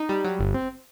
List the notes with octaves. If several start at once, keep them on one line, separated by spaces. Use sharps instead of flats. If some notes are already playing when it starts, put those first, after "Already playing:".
Already playing: D#4
G3
F#3
G1
C4